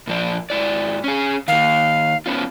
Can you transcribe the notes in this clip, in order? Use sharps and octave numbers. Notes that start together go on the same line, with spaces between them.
A#2 F3 D5
G#2 E4 D5
C#4 G#4
D#3 A#3 F5
B3 C#4 F4